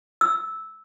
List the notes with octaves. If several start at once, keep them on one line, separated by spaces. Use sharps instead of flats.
E6